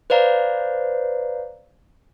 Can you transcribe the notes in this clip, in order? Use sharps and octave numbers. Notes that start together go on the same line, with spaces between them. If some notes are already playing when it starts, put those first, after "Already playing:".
B4 C5 D5 F5 A#5